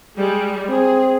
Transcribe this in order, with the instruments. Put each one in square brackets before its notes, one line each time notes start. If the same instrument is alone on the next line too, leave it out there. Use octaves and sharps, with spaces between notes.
[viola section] G3 G#3
[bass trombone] C4 [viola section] G#4